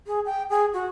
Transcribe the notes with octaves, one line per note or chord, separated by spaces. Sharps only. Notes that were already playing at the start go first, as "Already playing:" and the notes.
G#4
G5
G#4
F#4